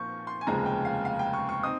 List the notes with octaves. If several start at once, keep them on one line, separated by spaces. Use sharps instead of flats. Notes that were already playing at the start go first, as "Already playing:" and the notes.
Already playing: A#2 F3 A#3 F4 C#6 G6
C6
G#5
F1 D#2 C#3 F3 G#3 A#5
G5
F5
F5
G5
C#6
C#6
C4 D#4 D#6